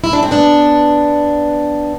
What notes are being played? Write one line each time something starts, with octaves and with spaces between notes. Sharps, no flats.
E4
D4
C4
B3 D4